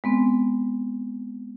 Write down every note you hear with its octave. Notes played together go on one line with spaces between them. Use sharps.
G#3 B3 C4